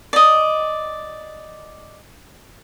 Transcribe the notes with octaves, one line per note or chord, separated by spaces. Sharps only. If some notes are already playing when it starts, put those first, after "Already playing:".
D5 D#5